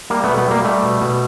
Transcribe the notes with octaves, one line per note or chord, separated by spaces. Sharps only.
G3 A#3
A3 B3
B2
A3 B3
G3 A#3
G3 A3
B2
B2